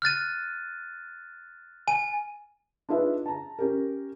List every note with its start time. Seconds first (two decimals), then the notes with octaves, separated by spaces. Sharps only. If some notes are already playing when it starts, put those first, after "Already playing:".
0.02 F6 F#6 A6 D#7
1.88 G#5 D#7
2.89 D4 D#4 F4 G#4 B4 E5
3.26 A5 A#5
3.59 C#4 G4 A#4